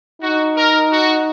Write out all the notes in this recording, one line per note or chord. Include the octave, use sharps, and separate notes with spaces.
D#4 F#4
A#4
F#4